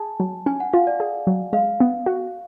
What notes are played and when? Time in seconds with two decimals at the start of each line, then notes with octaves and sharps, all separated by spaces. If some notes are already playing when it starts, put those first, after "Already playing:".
Already playing: G#4 G#5 A5
0.20 F#3
0.46 C#4 G#5
0.60 F#5
0.73 F4 F5
0.87 D5
1.00 G#4
1.27 F#3
1.53 G#3 F5
1.80 B3
2.06 F#4